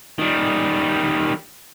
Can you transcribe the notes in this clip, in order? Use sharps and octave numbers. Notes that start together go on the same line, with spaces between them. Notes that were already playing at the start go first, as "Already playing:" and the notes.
D#3 G3